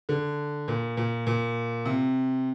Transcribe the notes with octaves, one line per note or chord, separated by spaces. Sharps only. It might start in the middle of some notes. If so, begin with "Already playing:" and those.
D3
A#2
A#2
A#2
C3